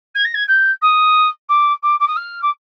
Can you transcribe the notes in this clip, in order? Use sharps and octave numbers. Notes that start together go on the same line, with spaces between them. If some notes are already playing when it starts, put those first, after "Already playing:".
G#6
A#6
G#6
G6
D#6
D6
D6
D6
D#6
F6
D6